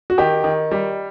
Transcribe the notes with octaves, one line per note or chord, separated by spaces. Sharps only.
F#4
D#3 G4
D#3
G3